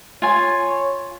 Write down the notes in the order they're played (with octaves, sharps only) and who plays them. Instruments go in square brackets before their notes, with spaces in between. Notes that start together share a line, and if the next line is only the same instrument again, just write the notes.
[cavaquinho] F4 G#5 [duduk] C#5